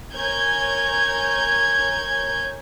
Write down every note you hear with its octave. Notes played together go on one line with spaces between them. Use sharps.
A#4 C#5 G#5 G6 G#6